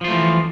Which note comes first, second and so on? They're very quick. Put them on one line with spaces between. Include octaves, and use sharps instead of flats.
F3 F4 A3 E3